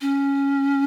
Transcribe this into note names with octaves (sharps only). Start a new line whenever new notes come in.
C#4